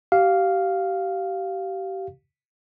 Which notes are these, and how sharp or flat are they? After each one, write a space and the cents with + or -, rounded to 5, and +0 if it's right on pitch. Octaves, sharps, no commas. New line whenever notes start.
G4 -30 F5 +0